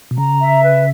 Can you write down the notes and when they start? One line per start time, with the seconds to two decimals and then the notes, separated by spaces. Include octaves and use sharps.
0.11 B2
0.17 C#3 A#5
0.41 E5
0.63 B4